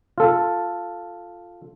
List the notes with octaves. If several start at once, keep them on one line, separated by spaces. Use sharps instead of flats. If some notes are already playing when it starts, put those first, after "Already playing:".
F4 A4